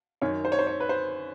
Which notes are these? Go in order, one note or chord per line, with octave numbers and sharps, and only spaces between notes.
F#2 D#3 C#5
C5
C#5
C5
C#5
B4
C5